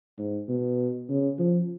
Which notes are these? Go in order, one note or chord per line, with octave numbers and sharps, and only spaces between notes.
G#2
B2
C#3
F3